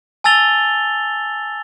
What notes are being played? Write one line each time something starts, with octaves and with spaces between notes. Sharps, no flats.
G#5 A5 E6 A6 F7 G7